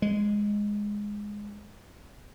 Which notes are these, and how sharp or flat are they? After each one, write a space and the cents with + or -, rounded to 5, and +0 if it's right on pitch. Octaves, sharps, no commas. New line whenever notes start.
G#3 -5